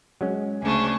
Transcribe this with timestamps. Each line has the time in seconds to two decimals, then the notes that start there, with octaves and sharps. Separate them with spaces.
0.21 F#3 G#3 C#4
0.63 D2 C#3 D4 G#5 C#6